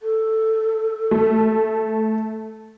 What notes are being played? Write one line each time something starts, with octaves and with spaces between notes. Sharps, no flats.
A4
A3